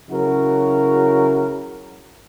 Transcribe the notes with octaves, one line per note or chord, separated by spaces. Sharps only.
C#3 F#3 E4 F#4 A#4